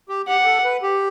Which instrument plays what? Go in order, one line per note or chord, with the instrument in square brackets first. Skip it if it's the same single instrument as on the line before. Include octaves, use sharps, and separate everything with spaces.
[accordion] G4
[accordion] G4 [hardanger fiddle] F#5
[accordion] G4
A4
B4
G4